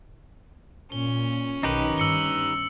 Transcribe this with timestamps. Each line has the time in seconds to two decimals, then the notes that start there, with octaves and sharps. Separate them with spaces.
0.92 A#2 C#4 G7
1.63 B1 D#3 D#4 G4 B4
1.98 G1 E6 C#7 G7